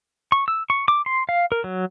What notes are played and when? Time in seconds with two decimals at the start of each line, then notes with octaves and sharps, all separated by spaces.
0.32 C#6
0.48 E6
0.70 C#6
0.88 D6
1.06 C6
1.29 F5
1.52 A#4
1.64 F#3